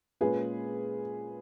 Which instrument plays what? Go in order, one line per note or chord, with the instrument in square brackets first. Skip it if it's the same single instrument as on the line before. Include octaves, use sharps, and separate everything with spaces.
[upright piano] A#2 G#3 C#4 F4 G#4 B4